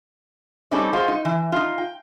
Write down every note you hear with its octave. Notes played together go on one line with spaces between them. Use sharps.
G3 C4 C#4 D#4 A4 D5
G#3 F4 F#4 C5
D#4
E3
D#4 F4
G5